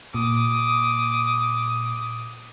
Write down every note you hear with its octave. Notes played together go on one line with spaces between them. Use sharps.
A#2 D6 D#6